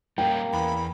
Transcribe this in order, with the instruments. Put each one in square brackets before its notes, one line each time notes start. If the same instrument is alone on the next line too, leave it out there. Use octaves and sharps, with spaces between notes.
[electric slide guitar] G3 C#4 [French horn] A#3 [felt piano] G5
[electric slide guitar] E2 [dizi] B5